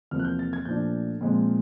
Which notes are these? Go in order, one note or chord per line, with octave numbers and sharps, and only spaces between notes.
E2 C3 F3 A#3 F6
F#6
G6
A6
G#6
A#2 F3 A3 D4 G6
A#2 F3 G#3 C4